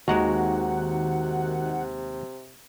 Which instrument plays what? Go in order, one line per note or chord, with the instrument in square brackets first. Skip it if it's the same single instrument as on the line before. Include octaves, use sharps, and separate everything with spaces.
[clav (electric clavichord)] D#2 G#3 [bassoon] C3 [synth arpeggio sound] D#3 F#5 [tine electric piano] F#4 A#5